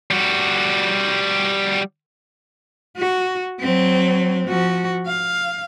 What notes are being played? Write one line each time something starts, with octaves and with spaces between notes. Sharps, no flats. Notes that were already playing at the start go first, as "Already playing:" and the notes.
G3 F#4
F#4
F#3 C4
F3 F#4
F5